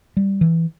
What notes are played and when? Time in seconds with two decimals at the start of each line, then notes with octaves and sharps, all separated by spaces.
0.17 G3
0.41 E3